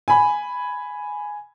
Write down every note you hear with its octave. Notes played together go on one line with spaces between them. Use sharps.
G#5 B5